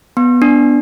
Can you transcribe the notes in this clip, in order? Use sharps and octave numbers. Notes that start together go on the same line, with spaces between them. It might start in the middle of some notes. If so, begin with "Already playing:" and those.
B3
D4